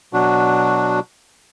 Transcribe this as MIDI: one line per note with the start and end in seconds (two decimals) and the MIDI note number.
0.13 1.00 47
0.13 1.00 54
0.13 1.00 62
0.13 1.00 66